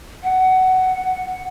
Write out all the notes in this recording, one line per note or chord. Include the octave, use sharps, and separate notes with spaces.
F#5